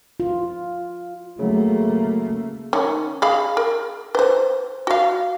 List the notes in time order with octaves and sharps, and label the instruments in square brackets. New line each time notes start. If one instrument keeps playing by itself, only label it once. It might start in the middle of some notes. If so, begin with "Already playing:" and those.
[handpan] F4
[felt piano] C#3 F#3 [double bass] A3 A#3
[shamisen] D#3 C#4
G#4 F5 B5
A#4
B4 C5
F#4 F5